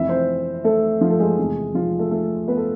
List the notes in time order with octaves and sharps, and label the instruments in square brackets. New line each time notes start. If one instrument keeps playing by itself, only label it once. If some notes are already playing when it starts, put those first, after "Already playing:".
Already playing: [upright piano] F1 F2 E3 E4 E5
C4 C5
A3 A4
F3 F4
A4
G#3 G#4
F1 E2 C3 E3
F3 F4
A3 A4
A3 A4
B3 B4
A4